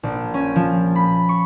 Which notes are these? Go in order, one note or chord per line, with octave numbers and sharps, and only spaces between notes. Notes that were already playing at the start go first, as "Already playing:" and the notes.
A#1
C#4
F3
B5
C#6